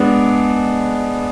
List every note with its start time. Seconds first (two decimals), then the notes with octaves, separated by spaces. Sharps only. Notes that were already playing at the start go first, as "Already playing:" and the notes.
Already playing: G#3 B3 D4